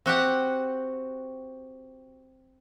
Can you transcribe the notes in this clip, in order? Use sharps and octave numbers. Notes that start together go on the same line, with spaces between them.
C4 F#4 G4 F#5